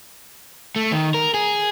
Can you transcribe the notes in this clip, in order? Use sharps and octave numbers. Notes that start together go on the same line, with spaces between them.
A3
D#3
A#4
G#4